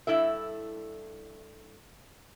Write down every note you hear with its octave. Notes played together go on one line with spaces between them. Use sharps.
G2 G3 E4 A4 E5